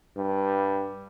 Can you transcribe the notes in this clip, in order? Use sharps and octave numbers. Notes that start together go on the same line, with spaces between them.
G2